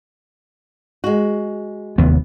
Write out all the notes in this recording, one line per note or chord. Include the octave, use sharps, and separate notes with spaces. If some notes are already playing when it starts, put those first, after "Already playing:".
G#3 F#4
F1 D#2 B3